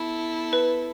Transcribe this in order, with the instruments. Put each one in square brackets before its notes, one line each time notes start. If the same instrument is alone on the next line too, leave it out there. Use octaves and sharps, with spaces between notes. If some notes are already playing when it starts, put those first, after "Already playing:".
Already playing: [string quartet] B3 E4 A4
[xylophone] B4